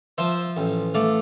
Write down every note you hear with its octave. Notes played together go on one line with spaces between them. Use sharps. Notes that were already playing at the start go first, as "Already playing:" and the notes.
F3 C5 E5
A1
A3 D5 F5